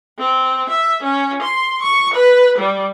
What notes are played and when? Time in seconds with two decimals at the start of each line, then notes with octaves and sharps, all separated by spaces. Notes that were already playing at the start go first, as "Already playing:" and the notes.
0.19 C4
0.70 E5
1.03 C#4
1.42 C6
1.82 C#6
2.14 B4
2.59 G3